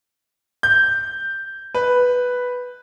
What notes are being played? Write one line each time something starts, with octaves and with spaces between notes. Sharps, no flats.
G6
B4